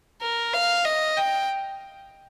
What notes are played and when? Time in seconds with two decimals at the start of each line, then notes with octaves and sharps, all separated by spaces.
0.22 A#4
0.54 F5
0.85 D#5
1.17 G5